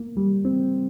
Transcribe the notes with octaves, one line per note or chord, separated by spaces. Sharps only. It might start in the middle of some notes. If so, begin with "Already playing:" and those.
Already playing: A#3
G3
C4